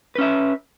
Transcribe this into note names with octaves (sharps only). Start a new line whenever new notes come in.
C#4 B4 E5